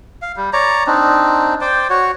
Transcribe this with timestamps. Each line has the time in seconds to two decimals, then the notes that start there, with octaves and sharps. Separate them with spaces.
0.22 F5
0.37 G3
0.53 C#5 D5 A#5
0.87 C4 D4 D#4
1.61 C5 D5 G5
1.90 F#4 C#5